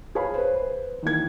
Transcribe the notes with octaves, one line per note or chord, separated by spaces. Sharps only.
G#4 B4 C#5 F5 B5
B4 C5
D#3 E3 A#3 G#6